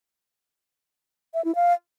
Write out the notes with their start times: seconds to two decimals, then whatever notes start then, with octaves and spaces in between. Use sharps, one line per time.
1.34 E5
1.45 E4
1.55 F5